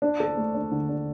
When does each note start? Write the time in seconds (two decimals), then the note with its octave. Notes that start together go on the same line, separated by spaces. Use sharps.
0.02 D4
0.20 A4
0.37 A3
0.55 D4
0.71 D3
0.89 D4